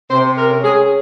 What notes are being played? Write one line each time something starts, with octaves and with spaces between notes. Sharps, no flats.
C3 C5
A#4
C#4
G#4